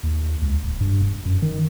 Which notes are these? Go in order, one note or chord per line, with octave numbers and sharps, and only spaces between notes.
D#2
D#2
C#2
D1
G2
E1
F#2
D#3